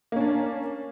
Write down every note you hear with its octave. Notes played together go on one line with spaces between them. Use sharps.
A#3 C#4 D4